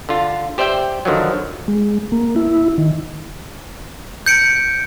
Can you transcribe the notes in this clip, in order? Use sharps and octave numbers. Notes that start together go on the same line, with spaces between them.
D3 F4
G4 C5 D5 E5 G5
D3 D#3 F3 F#3
G#3
A#3
E4
D#3
G6 C#7 D7